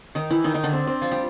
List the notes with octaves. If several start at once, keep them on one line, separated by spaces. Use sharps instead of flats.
D#3 D#4
E3 E4
D#3 D#4
D#3 D#4
D3 D4
C4
C4
F3 F4
G3 G4